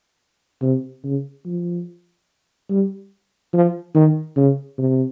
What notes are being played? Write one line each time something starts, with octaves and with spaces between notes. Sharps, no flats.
C3
C#3
F3
G3
F3
D#3
C#3
C3